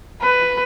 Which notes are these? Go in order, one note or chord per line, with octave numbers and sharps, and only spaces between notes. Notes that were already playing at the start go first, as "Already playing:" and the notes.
B4